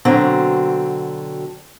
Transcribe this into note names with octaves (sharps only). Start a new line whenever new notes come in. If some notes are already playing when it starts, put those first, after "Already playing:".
B2 D3 F#3 C4 A#5